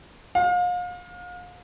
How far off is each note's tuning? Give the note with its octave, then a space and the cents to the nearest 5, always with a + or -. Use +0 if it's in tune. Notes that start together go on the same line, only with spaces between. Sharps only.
F5 +35